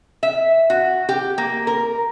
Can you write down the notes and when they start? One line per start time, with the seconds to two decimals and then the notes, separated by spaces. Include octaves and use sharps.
0.23 E5
0.70 F#4
1.09 G4
1.38 A#3
1.67 A#4